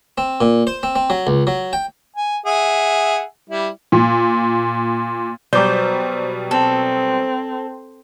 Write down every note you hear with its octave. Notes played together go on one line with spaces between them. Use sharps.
C4
A#2
C5
C4
C4
F#3
C#2
F#3
G5
G#5
G#4 E5 F#5
G3 E4
A#2
B2 F#3 G3 C5 D5 D6
C4 A4